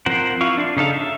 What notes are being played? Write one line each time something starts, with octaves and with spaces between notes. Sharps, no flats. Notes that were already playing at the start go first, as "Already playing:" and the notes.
F3 C4 A#4 C5 F#5
E4 F4 F5 C#6
D4
C#3 D#4 A4 F5
E5